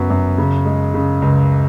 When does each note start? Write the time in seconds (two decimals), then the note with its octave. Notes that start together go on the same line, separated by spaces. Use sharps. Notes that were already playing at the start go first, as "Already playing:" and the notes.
Already playing: F#2 F#3 B3
0.10 F#2
0.38 C#3
0.66 G#3
0.94 C#3
1.22 C#2